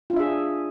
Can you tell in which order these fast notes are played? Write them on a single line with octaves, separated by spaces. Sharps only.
F4 D4 E5 G#4